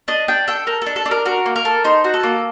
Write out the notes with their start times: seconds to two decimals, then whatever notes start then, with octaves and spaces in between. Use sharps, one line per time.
0.08 D4 D#5
0.28 D4 G5
0.48 A4 G5
0.67 A4 A#4
0.82 D4 A4
0.96 A4
1.06 D4
1.11 A#4
1.26 F#4 A#4
1.46 A#3
1.56 A#4
1.65 A4
1.84 D#4 C5
2.04 F#4
2.14 A4
2.23 A#3